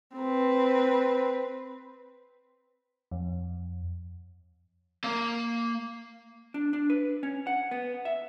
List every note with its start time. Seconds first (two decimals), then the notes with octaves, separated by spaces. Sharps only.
0.17 C4 B4
3.12 F2
5.04 A#3 F5
6.54 D4
6.73 D4
6.90 B4
7.23 C#4
7.47 F#5
7.71 B3
8.05 E5